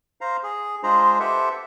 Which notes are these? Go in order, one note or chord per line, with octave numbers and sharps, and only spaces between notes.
C5 F5 A#5
G#4
G#3 D4 F4 G#4 C5 A#5
G4 A4 B4 C5 E5 F#5